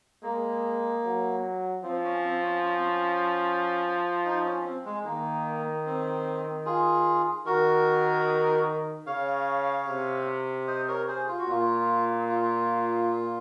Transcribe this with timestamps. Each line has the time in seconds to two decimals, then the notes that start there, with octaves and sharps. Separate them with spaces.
0.23 G#3 A#3
1.03 F#3
1.83 F3 C4
2.04 C#4
2.24 C4
2.44 C#4
2.64 C#4
2.73 C4
2.82 C#4
4.25 D#4
4.44 C#4
4.65 C4
4.85 G#3
5.05 D#3 A#3
5.86 C4
6.66 F4 G#4
7.46 D#3 F#4 A#4
9.07 C#3 C#5 F5
9.87 C3
10.67 C5 D#5
10.88 A#4 C#5
11.08 G#4 C5
11.28 F4
11.39 F#4
11.48 A#2 F4
12.29 F4